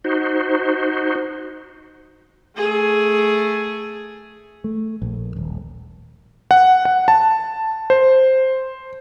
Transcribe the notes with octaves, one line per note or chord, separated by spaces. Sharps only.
D#4 F#4 C5
A3 G#4
A3
A#1
D#1
F#5
F#5
A5
C5